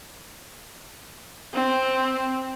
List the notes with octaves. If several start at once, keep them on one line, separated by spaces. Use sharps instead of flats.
C4